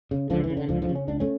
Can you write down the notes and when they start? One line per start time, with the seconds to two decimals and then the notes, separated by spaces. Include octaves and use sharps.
0.11 C#3
0.30 C#2 D3 F3
0.44 E3
0.50 C#3
0.57 D3
0.69 C#2 D3 F3
0.82 D3 F3
0.89 C#3
0.95 C#4
1.08 C#2 D4
1.20 A3 C#4